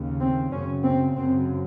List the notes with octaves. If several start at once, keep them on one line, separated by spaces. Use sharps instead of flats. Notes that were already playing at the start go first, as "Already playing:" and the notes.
Already playing: D#2 C#3
C4
F#2 C#3 C#4
C4
F#2 C#3 C4